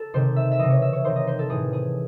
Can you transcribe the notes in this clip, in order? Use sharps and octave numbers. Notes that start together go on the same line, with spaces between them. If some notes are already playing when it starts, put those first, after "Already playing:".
Already playing: A4
C3 D#3 C5
E5
E5
C3 E3 D#5
C#5
E5
C#5
C3 D#3 C5
D#5
C5
A4
A2 E3 G#4
G#4